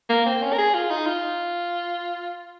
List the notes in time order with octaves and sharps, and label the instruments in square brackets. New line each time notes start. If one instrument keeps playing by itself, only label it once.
[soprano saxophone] A#3
C4
C#4
A#4
G#4
F4
D#4
F4